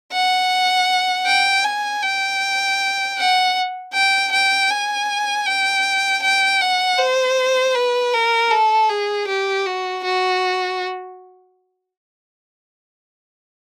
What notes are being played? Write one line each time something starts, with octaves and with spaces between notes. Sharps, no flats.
F#5
G5
G#5
G5
F#5
G5
G5
G#5
G5
G5
F#5
C5
B4
A#4
A4
G#4
G4
F#4
F#4